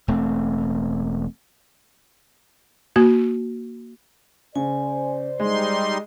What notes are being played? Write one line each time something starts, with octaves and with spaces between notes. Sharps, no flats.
E1 A3 C4
A#3 F#4
C#3 C5 D5 G#5
G3 G#3 D#4 D#5 C6